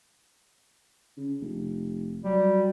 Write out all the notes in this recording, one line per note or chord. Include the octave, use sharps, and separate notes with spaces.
C#3
F1
F#3 G3